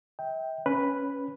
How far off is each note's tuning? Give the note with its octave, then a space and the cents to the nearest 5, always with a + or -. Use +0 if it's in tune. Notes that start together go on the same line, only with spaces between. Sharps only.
E5 -35 G5 +0
C#4 +0 B4 +0